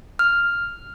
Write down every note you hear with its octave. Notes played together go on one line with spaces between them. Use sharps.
F6